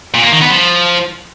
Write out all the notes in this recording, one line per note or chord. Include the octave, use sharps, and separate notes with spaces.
A#2
A#3
D#3
B3
F3